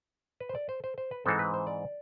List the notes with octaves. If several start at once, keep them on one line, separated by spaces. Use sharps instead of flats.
B4
C5
D5
C5
C5
C5
B4
G#2 E3 G#3 C4 A4
B4
C5
D5